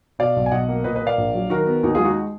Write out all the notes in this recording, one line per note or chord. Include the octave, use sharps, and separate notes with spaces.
B2 D5 F5
B1
G#5
B1 D#5 F#5
A#3
A#2 B4 D#5
B4 D#5
A#3 D5 F5
A#1
F#3
D#3 F#4 A#4
B3
D#2 D#4 F#4
G#3 F4 G#4
D#4 F#4